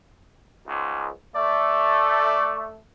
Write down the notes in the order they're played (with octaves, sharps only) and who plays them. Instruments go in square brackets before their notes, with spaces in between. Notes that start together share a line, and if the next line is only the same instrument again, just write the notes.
[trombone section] C#2 G#2
[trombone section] A3 [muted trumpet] D5